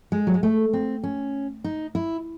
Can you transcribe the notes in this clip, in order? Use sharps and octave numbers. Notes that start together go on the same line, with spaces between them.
G#3
F#3
G#3
A3
C4
C#4
D#4
E4